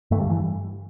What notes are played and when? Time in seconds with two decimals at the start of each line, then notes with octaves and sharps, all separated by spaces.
0.11 G2 D3 A3
0.20 G3
0.30 E3